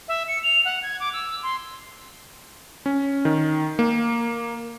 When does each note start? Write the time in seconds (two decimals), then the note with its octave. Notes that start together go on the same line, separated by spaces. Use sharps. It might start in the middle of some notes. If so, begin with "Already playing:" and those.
0.08 E5
0.28 C#7
0.43 F7
0.65 F#5
0.83 G#6
1.00 D6
1.13 E6
1.43 C6
2.86 C#4
3.25 D#3
3.79 A#3